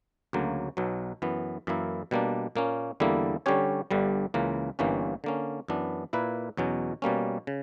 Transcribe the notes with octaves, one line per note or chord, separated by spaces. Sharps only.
D2 C#3 F#3 A#3
B1 B2 F#3
F#2 E3 B3
F#2 E3 A#3 E4
B2 G3 A#3 D4
A#2 A#3 C#4
E2 D3 G3 A#3 E4
D3 G3 C#4 G4 C#5
G1 G2 D3 G3
C#2 C#3 E3 A#3
G1 G2 E3 A#3 C#4
D3 A#3 C#4
F#2 E3 B3 D4
A#2 A#3 E4 B4
E2 B2 F#3 C#4
B2 G3 A#3 C#4
C#3